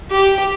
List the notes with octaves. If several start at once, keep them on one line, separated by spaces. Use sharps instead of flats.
G4